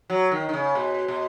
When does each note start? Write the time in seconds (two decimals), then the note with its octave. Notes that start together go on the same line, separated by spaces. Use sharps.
0.10 F#3
0.32 D#3
0.49 D#3
0.53 C#3
0.75 B2
1.08 B2